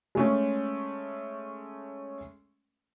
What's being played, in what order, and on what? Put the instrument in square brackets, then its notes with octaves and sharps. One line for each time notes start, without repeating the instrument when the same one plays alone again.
[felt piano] G#3 A3 C#4